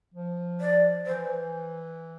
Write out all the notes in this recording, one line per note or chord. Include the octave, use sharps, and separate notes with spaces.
F3
D5
E3 C5